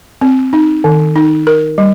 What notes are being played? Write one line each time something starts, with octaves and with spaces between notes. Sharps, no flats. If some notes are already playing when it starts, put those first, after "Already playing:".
C4
D#4
D#3
D#4
A#4
G3